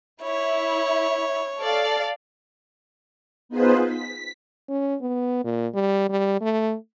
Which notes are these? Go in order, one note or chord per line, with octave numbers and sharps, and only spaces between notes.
E4 C#5
A4 D5 F5
B3 D#4 F4 G#4 B4 C5
B6
C#4
B3
A#2
G3
G3
A3